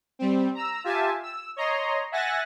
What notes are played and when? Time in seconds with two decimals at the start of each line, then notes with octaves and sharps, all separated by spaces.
0.19 G3 C4
0.55 A#5 E6
0.84 F4 G4 E5 G#5 A5
1.23 E6
1.56 C#5 D#5 A#5 C6
2.12 E5 F#5 G#5 F#6 A6 A#6